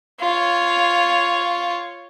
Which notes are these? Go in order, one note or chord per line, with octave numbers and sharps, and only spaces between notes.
F4 C#5